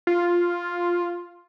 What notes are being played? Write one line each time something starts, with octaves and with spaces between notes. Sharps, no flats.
F4